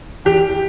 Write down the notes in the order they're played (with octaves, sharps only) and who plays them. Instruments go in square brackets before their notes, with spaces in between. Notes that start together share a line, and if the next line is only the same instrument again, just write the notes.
[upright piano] E2 G4